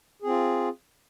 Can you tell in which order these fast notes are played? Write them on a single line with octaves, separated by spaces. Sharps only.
G#4 C4 F4